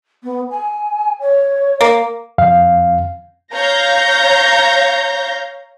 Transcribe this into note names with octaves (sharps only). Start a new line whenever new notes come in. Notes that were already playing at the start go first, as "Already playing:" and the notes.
B3
G#5
C#5
A#3
F2 F5
C#5 F5 A#5 G6 A#6